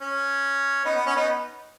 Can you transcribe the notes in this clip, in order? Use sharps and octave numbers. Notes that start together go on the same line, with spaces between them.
C#4
B3 D#4
B3
C#4
B3 D#4